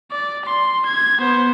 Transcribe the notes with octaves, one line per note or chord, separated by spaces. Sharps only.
D5
C6
G#6
B3 C5